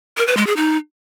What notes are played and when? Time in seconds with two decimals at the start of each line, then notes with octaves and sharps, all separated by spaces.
0.17 A#4
0.27 B4
0.37 G#3
0.47 G#4
0.57 D#4